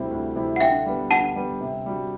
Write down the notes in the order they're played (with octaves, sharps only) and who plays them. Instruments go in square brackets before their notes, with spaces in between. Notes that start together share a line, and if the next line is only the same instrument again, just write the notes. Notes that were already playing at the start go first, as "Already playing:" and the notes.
Already playing: [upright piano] D2 C3 G3 C4 E4
D2
C3 G3 C4 E4
[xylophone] F#5
[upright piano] D3 [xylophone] E5 G5
[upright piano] G3 B3
[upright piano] D3 [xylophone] F#5 A5
[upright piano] G3 B3
C3
G3 D4 F#4